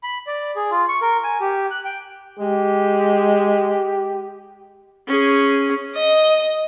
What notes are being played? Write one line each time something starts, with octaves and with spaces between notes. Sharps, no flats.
B5
D5
G#4
F4
C#6
A#4
G#5
G4
F#6
G5
G#3 G4
C#4 G#4
D#5